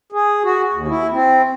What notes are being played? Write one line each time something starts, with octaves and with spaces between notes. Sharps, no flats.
G#4
F#4
D#2
E4
C4